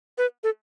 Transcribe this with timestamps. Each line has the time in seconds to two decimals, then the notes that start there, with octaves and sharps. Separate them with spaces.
0.18 B4
0.44 A4